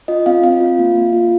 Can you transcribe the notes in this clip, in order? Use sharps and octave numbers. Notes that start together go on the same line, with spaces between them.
F4 D#5
C4 F5
C4 F5
F4
A#3
A#3
F4